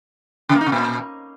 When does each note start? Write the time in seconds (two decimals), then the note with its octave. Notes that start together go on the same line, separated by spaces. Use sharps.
0.49 C#3
0.55 A#3
0.61 D#4
0.67 C3
0.72 A#2